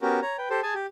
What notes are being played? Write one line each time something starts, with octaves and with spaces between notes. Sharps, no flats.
B3 C#4 F#4 G4 A#4
C#5 A#5
B4 G5
G4 A4 C5
G#4 G#5 A5
G4